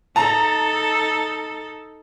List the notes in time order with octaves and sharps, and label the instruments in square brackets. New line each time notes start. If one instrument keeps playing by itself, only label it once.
[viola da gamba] D#4 A4 [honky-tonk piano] A5 A#5